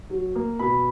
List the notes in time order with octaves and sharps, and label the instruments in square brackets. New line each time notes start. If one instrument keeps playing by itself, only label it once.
[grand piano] F#3
A#3
B2 B5